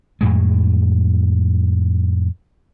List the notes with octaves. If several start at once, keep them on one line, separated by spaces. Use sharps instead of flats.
F2 A2 G#3